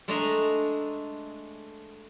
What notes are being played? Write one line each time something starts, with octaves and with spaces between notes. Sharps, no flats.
G#3 A3 D4 D#5 G#5 A#5